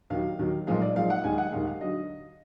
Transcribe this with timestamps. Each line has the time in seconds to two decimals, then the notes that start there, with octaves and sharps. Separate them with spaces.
0.10 D#2 D#3 F#3 F5
0.39 D#2 D#3 F#3
0.67 B1 A#2 F3 G#3 F5
0.82 D5
0.95 B1 A#2 F3 G#3 F5
1.10 F#5
1.24 D#2 D#3 G#3 G#5
1.38 F#5
1.52 D#2 D#3 G#3 F5
1.67 F5
1.81 D3 F#3 D#5